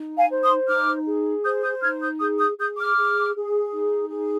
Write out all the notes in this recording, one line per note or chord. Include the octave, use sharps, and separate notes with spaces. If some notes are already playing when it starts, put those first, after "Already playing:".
Already playing: D#4
F5 G#5
C5
C6 D#6
D#4 D6 F6
G#4
C5 D#6 G6
D#6 G6
D#4 F6 G#6
D#6 G6
G#4 D#6 G6
D#6 G6
G#4 D#6 G6
D6 F6
G#4
G#4
D#4
G#4